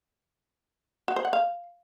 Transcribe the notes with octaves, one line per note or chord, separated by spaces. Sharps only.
F#4
C5
F#5
F5